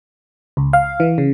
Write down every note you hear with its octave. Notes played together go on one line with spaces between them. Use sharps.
C#2
F5
E3
C#3